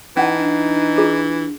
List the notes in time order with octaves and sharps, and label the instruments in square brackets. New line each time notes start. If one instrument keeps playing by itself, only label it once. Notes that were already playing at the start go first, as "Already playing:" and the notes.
[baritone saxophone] E3 [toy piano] C#4 F#5 A5 [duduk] D#4
[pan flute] D4
[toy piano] F4 G#4